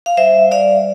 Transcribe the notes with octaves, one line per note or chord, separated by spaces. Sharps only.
F5
G3 C5 E5
G3 D5 F5